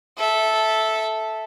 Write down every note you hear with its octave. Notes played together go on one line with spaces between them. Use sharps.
A4 E5